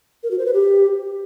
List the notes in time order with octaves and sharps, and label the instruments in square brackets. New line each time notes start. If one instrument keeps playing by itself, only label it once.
[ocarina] A#4
F#4
C5
B4
G4